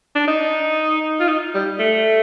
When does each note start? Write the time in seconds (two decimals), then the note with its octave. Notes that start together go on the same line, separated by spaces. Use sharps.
0.15 D4
0.27 D#4
1.20 F4
1.28 D#4
1.54 G3
1.79 A3